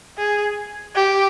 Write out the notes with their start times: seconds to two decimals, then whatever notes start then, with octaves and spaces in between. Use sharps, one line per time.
0.18 G#4
0.95 G4